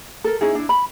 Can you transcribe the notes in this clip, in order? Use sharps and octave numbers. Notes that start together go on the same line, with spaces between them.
A4 A#4
C#4 D#4 E4 G#4
D4 E4
B5